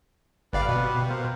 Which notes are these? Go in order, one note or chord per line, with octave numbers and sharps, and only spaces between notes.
G1 G4 B4 D5 F5 F#5
B2
A#4 C5 F5